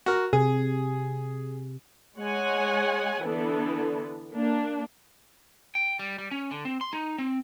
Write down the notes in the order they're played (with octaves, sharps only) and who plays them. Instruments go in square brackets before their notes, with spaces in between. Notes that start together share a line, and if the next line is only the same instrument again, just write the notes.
[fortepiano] F#4 A#4
[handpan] C3 [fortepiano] G#4
[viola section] G#3 C#5 F#5 G#5
D3 E3 B3 D4 A4
A#3 D4
[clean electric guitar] G5
G3
G3
C#4
D3
C4
C6
D#4
C4